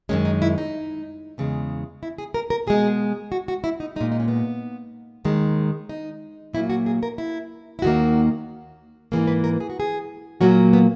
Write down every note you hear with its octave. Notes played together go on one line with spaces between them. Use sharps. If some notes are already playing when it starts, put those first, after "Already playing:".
F#2 D#3 G#3 C#4
D#4
E4
D#4
E2 C#3 G#3
E4
G#4
A#4
A#4
B2 G#3 G#4
F#4
F#4
E4
D#4
A#2 G#3 D#4
D#4
C#4
B3
D#2 D#3 G#3
D#4
A#2 F#3 A#3 E4
F#4
G#4
A#4
E4
E4
D#2 D#3 A#3 F#4
G#2 E3 A#3 G#4
B4
A#4
G#4
F#4
G#4
A#2 F#3 A#3 F#4
B3